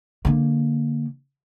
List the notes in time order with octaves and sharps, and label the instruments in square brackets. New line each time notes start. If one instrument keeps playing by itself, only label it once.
[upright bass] D3 A#3